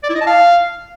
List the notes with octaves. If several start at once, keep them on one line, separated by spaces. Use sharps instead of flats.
D5
E4
D#5
A5
F5